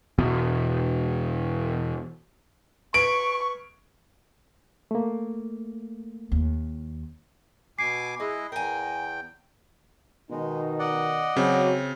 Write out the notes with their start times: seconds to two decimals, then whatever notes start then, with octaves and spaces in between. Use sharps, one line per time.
0.19 E2 B2
2.94 B4 C#6 D7
4.91 A3 A#3
6.32 D#2
7.79 B2 G#5 D6 C7
8.20 G#3 E4 D#5
8.52 E2 A#4 G5 G#5
10.30 B2 D#3 G#3 D#4
10.79 D5 D#5 F#5
11.37 C#3 F#3 C4